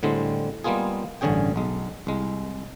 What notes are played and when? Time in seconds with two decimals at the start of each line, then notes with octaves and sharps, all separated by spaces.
0.03 A2 D3 G3 G#3 C4
0.64 G3 G#3 A#3 B3 F4 G#4
1.21 A1 G2 D3 C#4 G#4 G5
1.56 B1 G#3
2.07 C2 G#3